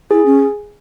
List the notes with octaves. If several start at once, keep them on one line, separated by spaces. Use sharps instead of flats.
E4 G#4
C#4